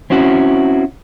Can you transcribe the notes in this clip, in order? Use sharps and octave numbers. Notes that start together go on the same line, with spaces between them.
C4 C#4 E4 F#4